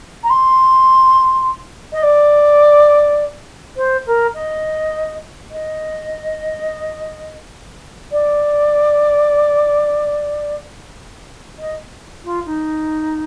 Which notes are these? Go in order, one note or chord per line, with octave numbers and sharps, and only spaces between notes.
A#5
C6
D#5
D5
C5
A#4
D#5
D#5
D5
D#5
F4
D#4